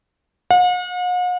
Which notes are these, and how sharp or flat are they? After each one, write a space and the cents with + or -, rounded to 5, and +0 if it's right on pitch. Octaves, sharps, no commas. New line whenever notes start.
F#5 -45